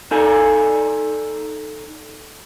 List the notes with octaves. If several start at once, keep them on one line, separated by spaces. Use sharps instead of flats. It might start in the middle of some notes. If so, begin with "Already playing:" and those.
D#4 A4 D5 G#5